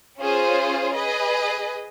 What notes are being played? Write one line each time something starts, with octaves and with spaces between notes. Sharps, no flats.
C#4 F4 G#4 C5
G#4 B4 D#5